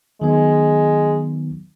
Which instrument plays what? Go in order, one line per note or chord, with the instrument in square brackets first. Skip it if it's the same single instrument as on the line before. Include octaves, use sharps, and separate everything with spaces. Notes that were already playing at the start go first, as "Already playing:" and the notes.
[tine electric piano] D#3 F#3 B3 [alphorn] G#3